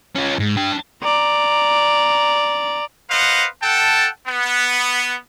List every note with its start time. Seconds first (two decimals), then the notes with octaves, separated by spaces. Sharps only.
0.15 C#4 F4
0.39 G#2
0.57 D4 G5
1.03 D5 A#5
3.10 B4 C5 D#5 F5 F#5
3.63 A4 F#5 G5 A5
4.27 B3